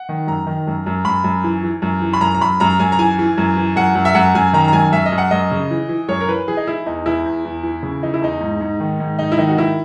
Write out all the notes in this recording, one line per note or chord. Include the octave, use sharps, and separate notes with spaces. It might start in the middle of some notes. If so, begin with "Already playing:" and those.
Already playing: F#5
D#3
F#2 A#5
D#3
F#2
F#2
F#2 B5
F#2
E3
E3
F#2
E3
B5
F#2 A#5
A#5
F#2 B5
F#2 A#5
F#2 G#5
A#5
E3 G#5
E3
F#2
E3
F#2 F#5
F#2
E5
F#2 F#5
F#2 G#5
D#3 A#5
A#5
F#2 G#5
F#2 E5
D#5
F#2
F#5
F#2 D#5
C#3
E3
E3
F#2 C#5
A#4
E3 B4
E3 G#4
D#4
E3 E4
E2 D#4
E2 E4
E2
E2
E3
C#3
E3 D#4
E4
E2 D#4
G#2
G#2
D#3
G#2
G#2 D#4
E4
D#3 D#4
F#4
D#3 E4